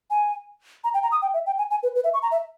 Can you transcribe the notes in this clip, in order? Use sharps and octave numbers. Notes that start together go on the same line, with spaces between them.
G#5
A#5
G5
A#5
D#6
G5
E5
G5
G#5
G#5
B4
B4
E5
C#6
A#5
E5